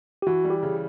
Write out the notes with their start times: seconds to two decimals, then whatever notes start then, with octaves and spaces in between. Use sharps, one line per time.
0.22 G4
0.27 E3 F#4
0.44 G3
0.50 G4
0.63 C#3